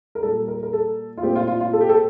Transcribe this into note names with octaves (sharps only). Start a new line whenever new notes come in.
A#4
A#2 G3 A#3 A4
A#4
A#4
A4
F4
A#2 A3 C4 G4
F4
F4
F4
A4
G4
A4